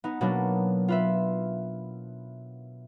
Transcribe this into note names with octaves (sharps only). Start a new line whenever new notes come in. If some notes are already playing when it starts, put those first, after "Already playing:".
B3 D#4
B2 F#3 A#3 B3 D4
F4 B4 E5